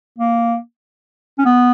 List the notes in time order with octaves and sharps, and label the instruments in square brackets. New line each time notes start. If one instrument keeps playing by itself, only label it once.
[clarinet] A#3
C#4
B3